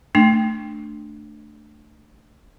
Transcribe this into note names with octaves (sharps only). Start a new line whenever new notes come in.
A3 D4 G5